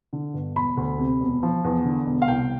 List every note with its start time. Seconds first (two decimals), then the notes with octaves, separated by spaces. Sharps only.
0.13 D3
0.34 G1
0.56 E1 B5
0.77 D2
0.98 C3
1.20 E1
1.43 F3
1.64 E2
1.85 D3
2.06 E1
2.22 F5
2.28 C2 G5